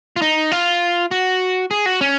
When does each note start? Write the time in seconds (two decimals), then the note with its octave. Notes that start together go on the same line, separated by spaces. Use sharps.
0.16 F4
0.22 D#4
0.52 F4
1.11 F#4
1.71 G#4
1.86 F#4
2.01 C#4